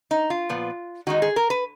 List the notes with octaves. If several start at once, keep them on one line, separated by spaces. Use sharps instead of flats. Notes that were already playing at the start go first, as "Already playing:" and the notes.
D#4
F4
A#2 F3 B3
D#3 G#3 D#4 F#4
G#4
A#4
B4